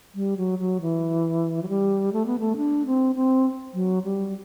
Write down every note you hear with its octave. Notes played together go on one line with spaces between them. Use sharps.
G3
F#3
F#3
E3
F#3
G3
A3
B3
A3
D4
C4
C4
F#3
G3